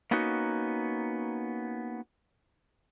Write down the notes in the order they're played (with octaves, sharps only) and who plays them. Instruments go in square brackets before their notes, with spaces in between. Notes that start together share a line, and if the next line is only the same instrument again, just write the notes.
[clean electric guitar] A#3 B3 C#4 D#4 F#4